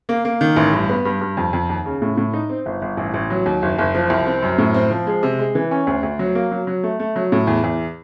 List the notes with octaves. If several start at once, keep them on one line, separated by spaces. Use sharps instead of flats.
A#3
A#3
D#3
A1
G2
B3
G2
G2
F2
F2
D#2
C#3
A2
A2
D#4
C4
G1
G1
A1
A1
F#3
D#2
F#1
F#1
F3
C2
C4
F#2
A2
C4
F3
G#3
C3
G#3
E3
C#4
D2
D2
F#3
A#3
F#3
F#3
A3
A3
F#3
A2
E2
E2